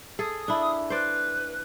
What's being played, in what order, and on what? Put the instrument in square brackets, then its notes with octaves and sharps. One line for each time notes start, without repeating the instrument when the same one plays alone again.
[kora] G#4 A4 [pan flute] D#6
[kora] D4 E4
[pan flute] B4 [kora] C5 D5